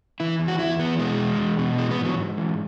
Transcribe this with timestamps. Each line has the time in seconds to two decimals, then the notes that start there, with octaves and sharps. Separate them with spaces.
0.20 E3 E4
0.39 E2
0.48 F#4
0.59 E2 E4
0.79 E3 B3
0.99 B2 G#3
1.19 E2
1.39 E2
1.59 B2
1.78 E3 G#3
1.91 B3
1.98 G#2
2.05 F#3
2.17 G#2
2.38 E3